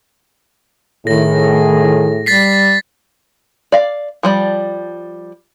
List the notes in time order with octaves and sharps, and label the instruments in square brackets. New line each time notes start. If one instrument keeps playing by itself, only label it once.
[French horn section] A2 [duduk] D#3 [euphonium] G#4 [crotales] A#6
[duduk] G3 [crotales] A6 B6 C7
[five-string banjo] D5 F5
F3 G3 D5